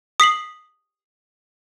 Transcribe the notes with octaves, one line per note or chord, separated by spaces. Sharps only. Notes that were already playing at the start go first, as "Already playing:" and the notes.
D#6 B6 C7 F#7